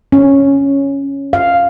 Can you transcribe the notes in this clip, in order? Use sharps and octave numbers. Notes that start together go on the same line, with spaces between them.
C#4
F5